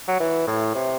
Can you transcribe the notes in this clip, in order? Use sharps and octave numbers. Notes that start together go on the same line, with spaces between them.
F#3
E3
A2
C3